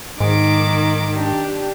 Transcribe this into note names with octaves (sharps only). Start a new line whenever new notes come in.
G#2 D#3 D6
D4 G4